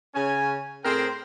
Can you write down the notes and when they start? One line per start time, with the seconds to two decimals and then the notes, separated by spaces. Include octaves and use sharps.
0.14 C#3 C#4 G#5
0.85 A2 C4 G#4 A#4 C5 G5